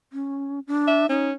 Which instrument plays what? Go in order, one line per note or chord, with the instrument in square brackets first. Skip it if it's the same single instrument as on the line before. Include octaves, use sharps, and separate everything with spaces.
[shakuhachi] C#4
D4
[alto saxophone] E5
[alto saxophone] C#4 [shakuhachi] D#4